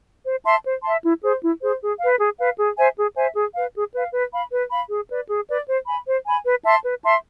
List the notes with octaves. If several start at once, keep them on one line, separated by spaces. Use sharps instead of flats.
C5
E5 A5 C6
C5
E5 A5 C6
E4
G#4 C5
E4
G#4 C5
G#4
B4 F5
G#4
B4 F5
G#4
C5 E5 G#5
G#4
C5 E5 G#5
G#4
B4 F5
G#4
B4 F5
B4
F5 B5
B4
F5 B5
G#4
B4 D5
G#4
B4 D5
C5
G#5 B5
C5
G#5 B5
B4
E5 A5 C6
B4
E5 A5 C6